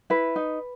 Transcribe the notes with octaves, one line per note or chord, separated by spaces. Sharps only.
E4 B4
D#4